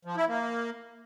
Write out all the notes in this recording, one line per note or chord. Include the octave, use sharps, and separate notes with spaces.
F3
E4
A#3